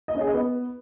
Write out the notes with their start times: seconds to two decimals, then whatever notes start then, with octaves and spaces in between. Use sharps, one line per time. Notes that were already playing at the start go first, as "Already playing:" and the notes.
0.08 D#5
0.15 C#4
0.21 G#4
0.27 D#5
0.34 B3